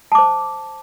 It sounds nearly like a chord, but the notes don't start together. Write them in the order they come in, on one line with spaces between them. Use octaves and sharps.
A5 D6 C5